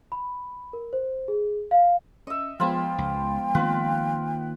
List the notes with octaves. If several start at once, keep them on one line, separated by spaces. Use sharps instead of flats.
B5
A#4
C5
G#4
F5
C#4 D#5 E5
F3 G#3 B3 F4 C5 G5 B5
C#2
D#3 A#3 C4 F4 B4